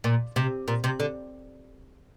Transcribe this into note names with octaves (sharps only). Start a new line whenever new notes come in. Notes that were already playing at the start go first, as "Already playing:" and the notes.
A#2
C3
A#2
C3
D3